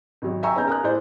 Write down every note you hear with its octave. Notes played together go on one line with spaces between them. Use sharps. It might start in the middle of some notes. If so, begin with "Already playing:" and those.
G#1 F#3
E5 G5 G#5 A#5 C#6 E6
B3 C#4 D#4 A#5 G6
A#4 G#5 D#6 F#6
A2 G#4 C5 D5 G6